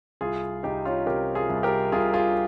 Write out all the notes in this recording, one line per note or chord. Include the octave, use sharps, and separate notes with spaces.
C2 F4 G#4
C2 D#4 G4
C#4 F4
C3 G4 A#4
F4 G#4
C2
G4 A#4
C2 F4 G#4
F4 G#4